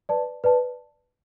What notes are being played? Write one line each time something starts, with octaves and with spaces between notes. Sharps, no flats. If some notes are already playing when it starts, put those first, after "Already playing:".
B4 D5 A5
B4 D5 A5